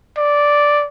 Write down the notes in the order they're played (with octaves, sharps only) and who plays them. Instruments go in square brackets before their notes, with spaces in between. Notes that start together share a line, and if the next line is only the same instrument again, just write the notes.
[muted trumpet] D5